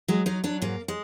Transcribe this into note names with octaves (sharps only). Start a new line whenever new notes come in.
F#3 G#3
F#3 D#4
F#3 D4
G#2 A#3
G#3